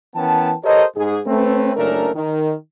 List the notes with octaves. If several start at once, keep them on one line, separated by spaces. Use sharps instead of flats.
E3 B3 C#4 A#4 G5 A5
G4 A4 A#4 C5 C#5 D#5
G#2 G#4
A3 C4 C#4 B4
F#1 C#2 A3 C#4 D4 A#4
D#3